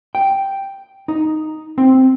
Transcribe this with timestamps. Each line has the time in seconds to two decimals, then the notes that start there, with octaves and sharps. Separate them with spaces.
0.15 G5
1.08 D#4
1.78 C4